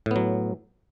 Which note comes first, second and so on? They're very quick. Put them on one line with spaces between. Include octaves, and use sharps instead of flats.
A2 B3 F#3